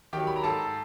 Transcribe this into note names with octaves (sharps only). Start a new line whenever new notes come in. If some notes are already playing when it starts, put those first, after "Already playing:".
D#3 F#3 G4 G5
B5
A#5
G#2 A4 A5